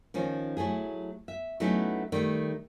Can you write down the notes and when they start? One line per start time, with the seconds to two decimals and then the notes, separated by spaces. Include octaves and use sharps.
0.14 D#3 F3 C#4 D#4
0.57 F#3 A3 E4 G#4
1.28 E5
1.60 F#3 A3 B3 C#4 D#4 E4
2.12 D#3 G3 A3